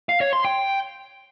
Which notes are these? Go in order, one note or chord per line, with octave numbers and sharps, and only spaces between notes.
F5
C#5
C6
G5